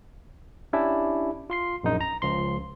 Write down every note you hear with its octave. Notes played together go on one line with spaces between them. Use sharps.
C#4 D4 E4 G4 E5
F4 C6 C7
A#1 F#2 D#4
A#5
C#2 F3 C6